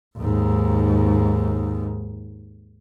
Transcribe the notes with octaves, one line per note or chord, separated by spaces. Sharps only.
D#2 G#2